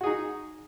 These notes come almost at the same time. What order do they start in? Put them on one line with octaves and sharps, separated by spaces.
F#4 G#4 D#4